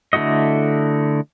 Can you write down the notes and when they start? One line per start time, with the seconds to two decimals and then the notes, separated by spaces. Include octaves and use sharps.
0.13 D3 A3 E4 F#4 D#5